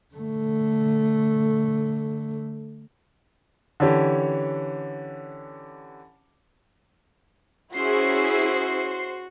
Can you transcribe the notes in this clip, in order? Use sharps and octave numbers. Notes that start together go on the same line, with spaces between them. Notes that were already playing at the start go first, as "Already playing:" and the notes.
D3 A3
D3 E3 C#4 G4
C#4 E4 F#4 G#4 C5 C6 C7